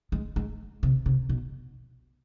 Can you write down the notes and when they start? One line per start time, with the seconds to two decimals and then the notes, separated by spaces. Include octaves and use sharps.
0.12 G#3
0.36 G#3
0.83 C3
1.06 C3
1.29 B2